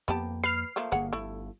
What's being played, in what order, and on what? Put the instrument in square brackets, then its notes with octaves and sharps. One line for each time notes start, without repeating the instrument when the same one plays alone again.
[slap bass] F2 A#3 [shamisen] B3 G4 A5
[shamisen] B4 [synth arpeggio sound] F6 C7
[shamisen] F3 A3 A#3
[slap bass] G1 A#3 [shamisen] G#4 C#5 F#5
[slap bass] G1 [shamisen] A3 E4